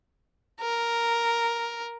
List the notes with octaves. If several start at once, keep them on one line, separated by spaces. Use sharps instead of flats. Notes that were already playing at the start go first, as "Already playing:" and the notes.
A#4